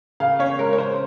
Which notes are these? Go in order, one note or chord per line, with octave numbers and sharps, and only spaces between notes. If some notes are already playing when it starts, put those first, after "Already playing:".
C#3 F5
C#4 C#5
G#3 A#4
C#5
C#3 C5